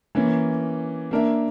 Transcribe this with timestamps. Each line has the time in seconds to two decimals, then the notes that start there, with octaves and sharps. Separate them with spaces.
0.15 E3 A#3 C#4
1.11 A#3 D4 A#4 E5